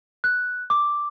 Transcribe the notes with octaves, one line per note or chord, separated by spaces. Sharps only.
F#6
D6